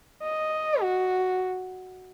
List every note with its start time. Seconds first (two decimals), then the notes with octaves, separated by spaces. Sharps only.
0.23 D#5
0.81 F#4